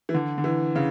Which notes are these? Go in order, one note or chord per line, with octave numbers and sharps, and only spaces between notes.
E3
D3
D3
E3
C#3